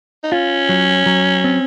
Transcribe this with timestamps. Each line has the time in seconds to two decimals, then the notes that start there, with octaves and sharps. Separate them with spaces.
0.23 D#4
0.32 C#4 F4
0.69 F#3
1.06 F#3
1.44 C4